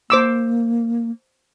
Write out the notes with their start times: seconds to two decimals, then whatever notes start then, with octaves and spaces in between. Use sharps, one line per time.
0.10 A#3 C5 D6 E6